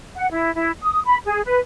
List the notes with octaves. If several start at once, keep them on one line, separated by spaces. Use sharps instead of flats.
F#5
E4
E4
D#6
B5
G#4
B4